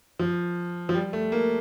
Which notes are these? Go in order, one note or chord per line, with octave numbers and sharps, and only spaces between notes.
F3
F3
G3
A3
A#3